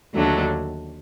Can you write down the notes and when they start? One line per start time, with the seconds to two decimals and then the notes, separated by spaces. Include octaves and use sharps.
0.14 D#2 D3 F#3 A3 D4